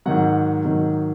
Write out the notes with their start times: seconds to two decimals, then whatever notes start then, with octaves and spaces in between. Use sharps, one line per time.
0.06 G#2 D#3 F#3 F#5
0.65 G#2 D#3 F#3